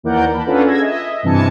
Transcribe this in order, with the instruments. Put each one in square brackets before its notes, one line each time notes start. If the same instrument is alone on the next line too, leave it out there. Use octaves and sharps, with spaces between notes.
[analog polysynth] D#2 E3 A#4 D5 F#5 G6
A5 B5
C#4 D4 F4 A4 B4 F#5
G#4 E6 G#6 A#6
D#5 E5
G2 C3 E3 G#5 A5 C#7